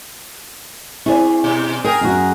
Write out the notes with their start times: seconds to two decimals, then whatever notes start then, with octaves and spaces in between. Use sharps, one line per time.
1.06 C4 E4 G#4 D5
1.44 B2
1.84 G#4 A#4 G5
2.01 F#2 F#4